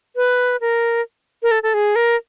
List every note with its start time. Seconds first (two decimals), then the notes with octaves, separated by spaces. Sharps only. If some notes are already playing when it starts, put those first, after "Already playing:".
0.16 B4
0.61 A#4
1.43 A#4
1.51 A4
1.63 A4
1.74 G#4
1.96 A#4